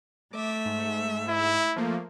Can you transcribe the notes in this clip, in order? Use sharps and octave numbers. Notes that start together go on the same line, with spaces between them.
A3 E5 D6
G#2
E4
F3 A3 A#3